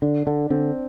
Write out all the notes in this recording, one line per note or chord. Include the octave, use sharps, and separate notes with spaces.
D3 D4
D3 D4
D3 C4